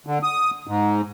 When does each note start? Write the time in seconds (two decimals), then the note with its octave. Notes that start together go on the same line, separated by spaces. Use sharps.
0.07 D3
0.23 D#6
0.67 G#2